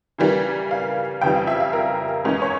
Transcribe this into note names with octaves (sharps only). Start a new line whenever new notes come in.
C#3 E3 G3 A#3
F5
F2 C#3 E3 G3 G5
F5
E5
F5
A#4
E2 E3 G#3 C#4 A#4
C#5